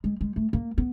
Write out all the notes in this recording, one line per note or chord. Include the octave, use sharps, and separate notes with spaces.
G#3
G#3
A3
A#3
B3